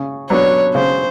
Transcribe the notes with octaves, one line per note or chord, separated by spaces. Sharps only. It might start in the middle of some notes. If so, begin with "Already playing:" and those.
Already playing: C#3
F#3 B3 D4 C#5
C#3 C5